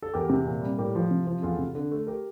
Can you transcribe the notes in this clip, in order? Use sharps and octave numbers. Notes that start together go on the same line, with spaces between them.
A4
E2 G4 A#4
C3
A#2
G3
A2 G4 A#4
F3
C3
F3
E2 F4 A4
C3
D3
A3
G4 A#4